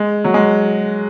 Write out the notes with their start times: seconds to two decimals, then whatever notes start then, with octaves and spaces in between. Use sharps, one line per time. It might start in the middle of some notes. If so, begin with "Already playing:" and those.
Already playing: G#3
0.24 F#3
0.34 G#3